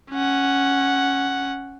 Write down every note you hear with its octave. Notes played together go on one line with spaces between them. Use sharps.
C#4 F#5